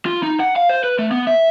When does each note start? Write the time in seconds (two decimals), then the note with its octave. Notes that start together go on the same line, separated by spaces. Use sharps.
0.06 F4
0.23 D#4
0.40 F#5
0.56 F5
0.69 C5
0.84 B4
0.99 A3
1.11 B3
1.27 E5